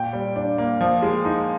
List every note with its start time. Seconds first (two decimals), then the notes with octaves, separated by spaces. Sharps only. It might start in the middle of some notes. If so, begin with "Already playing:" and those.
Already playing: A#2 G5
0.13 G3
0.36 D4
0.58 A#3
0.81 F3
1.02 G#3
1.25 D#4